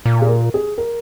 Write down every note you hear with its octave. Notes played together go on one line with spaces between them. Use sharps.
A#2
G#4
A#4
G#4
A#4